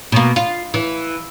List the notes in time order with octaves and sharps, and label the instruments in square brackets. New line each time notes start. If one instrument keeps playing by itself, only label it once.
[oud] B2 A#3
F4
E3